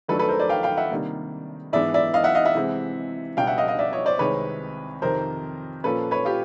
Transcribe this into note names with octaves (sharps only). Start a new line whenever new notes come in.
D#2 D#3 F#3 A3 D4 A4 B4
A4 B4
A#4 C5
C5 D5
F5 G5
F5 G5
E5 F#5
C3 D#3 G3 A#3 D4
G#2 E3 G#3 B3 D4 D5 E5
D5 E5
D#5 F5
E5 F#5
D#5 F5
E5 F#5
C3 E3 G#3 C4
C#2 B2 G3 B3 D4 F5 G5
E5 F#5
D#5 F5
D#5 F5
D5 E5
C#5 D#5
C5 D5
C2 C3 D#3 G#3 C4 B4 C#5
F2 C3 D#3 A#4 C5
A#2 F3 A#3 C#4 A4 B4
B4 C#5
F4 G4